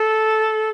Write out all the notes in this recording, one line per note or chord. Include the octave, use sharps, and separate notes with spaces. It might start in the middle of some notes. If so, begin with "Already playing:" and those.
Already playing: A4